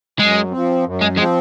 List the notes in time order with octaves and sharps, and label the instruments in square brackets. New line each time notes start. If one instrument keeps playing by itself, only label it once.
[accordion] F#2 [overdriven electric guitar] G#3
[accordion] F3 C4
F#2
[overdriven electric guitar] G#3
[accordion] F3 C4 [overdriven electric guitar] G#3